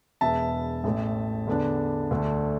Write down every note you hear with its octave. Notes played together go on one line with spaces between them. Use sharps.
E1 E2 B2 B3 E5 A5
A1 A2 A3
E2 D3 B3 D4
D2 D3 A3 D4